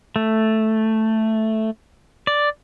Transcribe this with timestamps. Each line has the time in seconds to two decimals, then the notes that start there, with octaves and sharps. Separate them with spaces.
0.16 A3
2.27 D5